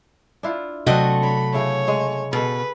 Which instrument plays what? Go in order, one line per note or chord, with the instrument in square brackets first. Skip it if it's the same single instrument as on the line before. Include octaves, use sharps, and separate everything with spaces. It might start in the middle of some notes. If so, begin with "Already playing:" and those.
[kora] D4 E4 F4
[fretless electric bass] C3 F#3 [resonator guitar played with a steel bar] A3 F#4 D#5 [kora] C4 D4 C5
[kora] C#5 [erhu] B5
[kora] C#3 E4 [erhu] C#5
[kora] G#3
[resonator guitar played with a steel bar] B2 [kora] G#4 A4 [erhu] B4